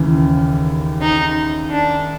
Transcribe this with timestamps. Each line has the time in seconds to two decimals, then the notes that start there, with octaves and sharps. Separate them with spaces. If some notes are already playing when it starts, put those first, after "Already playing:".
Already playing: D#2 C#3 E3
1.01 D#4
1.71 D4